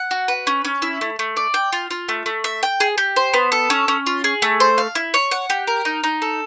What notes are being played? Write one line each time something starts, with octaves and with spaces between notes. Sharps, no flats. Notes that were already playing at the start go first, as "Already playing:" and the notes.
Already playing: F#5
F#4
B4
C#4
C#4
E4
A3
A3
D5
G5
F4
F4
A3
A3
E5
G5
G#4
G4
C5
B3
A4
C#4
C#4
F4
G#4
A3
C5
F5
E4
C#5
F#5
G4
A#4
D#4
D#4
A4